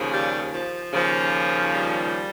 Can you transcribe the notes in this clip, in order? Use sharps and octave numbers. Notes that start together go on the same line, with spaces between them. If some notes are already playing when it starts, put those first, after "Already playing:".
Already playing: D#2 C#3 F3
G3
F3
D#2 C#3 F3
G3